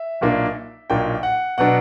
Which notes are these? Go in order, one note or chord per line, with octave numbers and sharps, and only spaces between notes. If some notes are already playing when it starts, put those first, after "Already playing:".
Already playing: E5
B1 A#2 A#3 D4
B1 A#2 A#3 D4 G5
F#5
B2 F#3 B3 D4 F#5